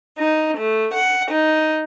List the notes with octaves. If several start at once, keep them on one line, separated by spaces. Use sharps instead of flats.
D#4
A3
F#5
D#4